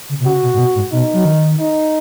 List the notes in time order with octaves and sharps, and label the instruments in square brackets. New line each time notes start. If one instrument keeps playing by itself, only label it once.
[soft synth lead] C#3
B2
[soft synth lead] C#3 [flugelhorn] F#4
[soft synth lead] B2
G#2
B2
G#2
[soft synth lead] B2 [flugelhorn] D#4
[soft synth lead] F#3
D#3
[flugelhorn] D#4